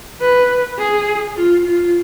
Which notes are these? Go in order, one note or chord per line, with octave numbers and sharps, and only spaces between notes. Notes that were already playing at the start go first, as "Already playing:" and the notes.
B4
G#4
F4
F4